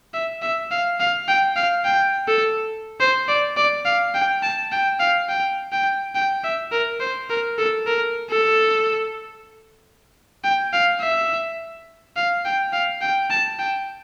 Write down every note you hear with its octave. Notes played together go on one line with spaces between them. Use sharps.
E5
E5
F5
F5
G5
F5
G5
A4
C5
D5
D5
F5
G5
A5
G5
F5
G5
G5
G5
E5
A#4
C5
A#4
A4
A#4
A4
G5
F5
E5
F5
G5
F5
G5
A5
G5